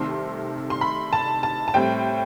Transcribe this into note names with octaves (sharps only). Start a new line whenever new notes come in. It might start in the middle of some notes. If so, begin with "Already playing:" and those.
Already playing: C2 C3 D#3 A3 C4 C6
C6
B5
A5
A5
A5
A2 G3 C4 G5